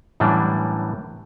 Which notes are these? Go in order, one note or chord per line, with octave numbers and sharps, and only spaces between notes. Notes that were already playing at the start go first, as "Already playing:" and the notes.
F#2 A2 E3 G3 D4